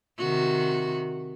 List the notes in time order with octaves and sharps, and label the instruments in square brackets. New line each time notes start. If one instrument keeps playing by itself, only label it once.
[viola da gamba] C3 D#3 F#4